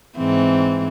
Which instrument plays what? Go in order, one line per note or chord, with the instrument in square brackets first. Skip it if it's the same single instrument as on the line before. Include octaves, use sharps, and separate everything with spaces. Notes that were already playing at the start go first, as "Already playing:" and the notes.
[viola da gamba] G#2 E3 C4